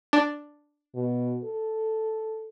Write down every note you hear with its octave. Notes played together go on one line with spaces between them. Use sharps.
D4
B2
A4